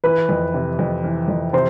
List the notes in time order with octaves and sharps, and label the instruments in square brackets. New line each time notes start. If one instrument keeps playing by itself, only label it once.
[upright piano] E3 [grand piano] B4
[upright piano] F2
C3
F2
E3
F2
[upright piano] C3 [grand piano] C5